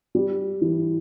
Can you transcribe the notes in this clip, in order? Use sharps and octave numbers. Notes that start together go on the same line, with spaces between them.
G3
E3